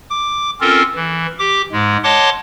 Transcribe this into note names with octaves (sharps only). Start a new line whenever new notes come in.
D6
C4 C#4 F4 A4 A#4
E3
G4 D6
G#2 G#3
C#5 D#5 F#5 A5 C6 D6